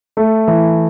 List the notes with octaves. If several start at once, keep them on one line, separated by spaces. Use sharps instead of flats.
A3
E3